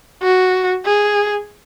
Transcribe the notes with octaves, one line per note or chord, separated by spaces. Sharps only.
F#4
G#4